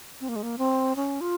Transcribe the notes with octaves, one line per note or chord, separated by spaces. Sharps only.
C4
A#3
G#3
A#3
C4
C#4
F4